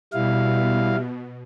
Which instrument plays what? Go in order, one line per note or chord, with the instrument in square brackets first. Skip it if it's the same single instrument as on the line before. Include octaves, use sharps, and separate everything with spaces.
[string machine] B2 [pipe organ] G3 E4 F5